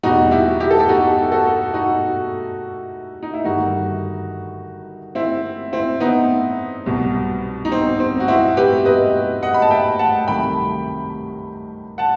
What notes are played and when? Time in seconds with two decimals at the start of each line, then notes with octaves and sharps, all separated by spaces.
0.03 E2 B2 G3 D#4 F#4
0.31 E4 G4
0.60 E4 G4
0.71 A4
0.80 G4
0.89 D#4 F#4
1.32 F#4 A4
1.74 D#4 F#4
3.23 D#4
3.34 E4
3.44 G1 G2 D#3 D#4 F#4
5.15 C4 E4
5.73 C4 E4
6.00 B3 D#4
6.86 C2 B2 F#3
7.65 D#4
7.72 C4
8.00 C4
8.20 F#4
8.28 C4 E4
8.57 G4 B4
8.85 B4 D#5
9.43 D#5 F#5
9.54 B5
9.62 A5
9.70 E5 G5
9.99 F#5 A5
10.28 C2 C3 D#3 F#3 A3 G5 B5
11.98 F#5 A5